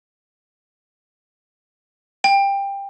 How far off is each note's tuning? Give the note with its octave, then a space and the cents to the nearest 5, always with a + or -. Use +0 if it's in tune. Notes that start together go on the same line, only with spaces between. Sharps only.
G5 +20